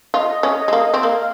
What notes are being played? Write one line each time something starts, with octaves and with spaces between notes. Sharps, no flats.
F4 D#5
C#4
G#3
A#3
C4
A#3 D#5
F5